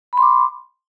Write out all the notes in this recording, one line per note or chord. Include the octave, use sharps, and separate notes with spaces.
B5 C6 D6